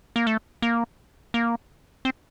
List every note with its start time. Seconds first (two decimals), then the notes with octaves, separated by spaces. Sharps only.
0.16 A#3
0.27 A3
0.62 A#3
1.34 A#3
2.05 C4